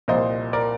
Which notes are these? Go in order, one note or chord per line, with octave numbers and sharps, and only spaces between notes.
C2 A#2 F3 C5 D#5
A#4 D5